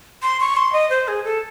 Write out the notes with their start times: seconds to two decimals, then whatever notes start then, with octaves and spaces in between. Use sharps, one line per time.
0.22 C6
0.40 C#6
0.56 C6
0.73 D#5
0.90 C5
1.08 G#4
1.24 A4